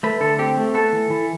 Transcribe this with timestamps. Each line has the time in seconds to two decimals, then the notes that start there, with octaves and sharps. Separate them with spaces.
0.03 A3 B4
0.21 D3 A4
0.39 C4 G4
0.57 A3
0.74 B3 A4
0.93 E3
1.10 E3